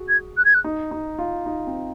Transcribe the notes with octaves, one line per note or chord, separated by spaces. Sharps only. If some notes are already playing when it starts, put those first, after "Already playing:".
Already playing: F#4 G#4
G#6
F#6
G#6
F#6
D#4
D#4
F4
D#4
C4